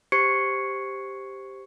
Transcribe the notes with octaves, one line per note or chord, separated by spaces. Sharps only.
G4 C5 C#6 G#6 C7 C#7